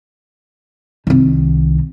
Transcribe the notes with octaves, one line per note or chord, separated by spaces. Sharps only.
C2 D#3